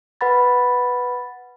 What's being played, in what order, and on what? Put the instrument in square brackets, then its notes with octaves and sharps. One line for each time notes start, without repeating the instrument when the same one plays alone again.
[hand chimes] B4 F#5 B5 A6